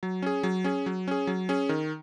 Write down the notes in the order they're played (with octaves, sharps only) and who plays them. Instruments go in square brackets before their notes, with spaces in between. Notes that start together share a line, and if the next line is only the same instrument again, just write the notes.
[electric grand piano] F#3
C#4 G#4
F#3
C#4 G#4
F#3
C#4 G#4
F#3
C#4 G#4
D#3